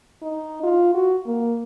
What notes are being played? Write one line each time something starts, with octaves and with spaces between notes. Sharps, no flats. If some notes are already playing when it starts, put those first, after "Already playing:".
D#4
F4
F#4
A#3